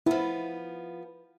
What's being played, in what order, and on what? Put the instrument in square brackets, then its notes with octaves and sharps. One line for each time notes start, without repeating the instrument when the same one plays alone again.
[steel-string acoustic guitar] F3 B3 [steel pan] E4